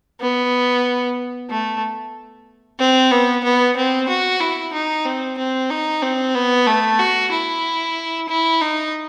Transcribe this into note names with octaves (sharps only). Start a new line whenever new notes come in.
B3
A3
C4
B3
B3
C4
F#4
E4
D#4
C4
C4
D#4
C4
B3
A3
F#4
E4
E4
D#4